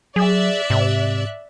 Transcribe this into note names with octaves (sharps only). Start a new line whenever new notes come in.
F#3 G#4 D5 E5 F#6
G#2 C3